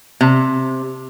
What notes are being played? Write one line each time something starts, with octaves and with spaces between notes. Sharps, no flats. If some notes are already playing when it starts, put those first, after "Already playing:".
C3